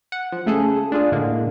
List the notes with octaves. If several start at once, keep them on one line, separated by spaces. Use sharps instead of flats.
F#5
F3
C#3 A3 G#4 A4
D4 F4 G#4
A2 D3 G#3 A#3